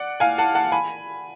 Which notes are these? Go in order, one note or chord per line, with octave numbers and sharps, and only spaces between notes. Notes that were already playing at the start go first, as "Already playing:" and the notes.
Already playing: D5 F#5
F5 G#5
F#5 A5
F#5 A5
G#5 B5